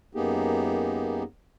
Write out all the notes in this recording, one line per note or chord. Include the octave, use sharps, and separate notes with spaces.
F#2 A#3 B3 D#4 G4 G#4